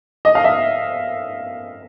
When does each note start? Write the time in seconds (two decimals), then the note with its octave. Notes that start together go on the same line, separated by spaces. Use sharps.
0.25 D#5
0.35 F5
0.44 E5